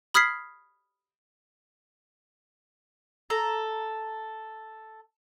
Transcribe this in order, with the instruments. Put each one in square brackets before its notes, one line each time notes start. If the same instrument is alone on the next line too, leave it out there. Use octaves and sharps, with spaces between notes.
[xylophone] B5 D#6 F6 G#6 B6 C7
[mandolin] A4 A#5